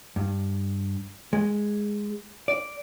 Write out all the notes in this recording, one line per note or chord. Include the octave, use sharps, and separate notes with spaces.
G2
G#3
D5